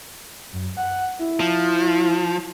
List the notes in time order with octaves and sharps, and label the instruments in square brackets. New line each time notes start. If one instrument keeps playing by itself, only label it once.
[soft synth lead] F#2
F#5
E4
[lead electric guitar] F3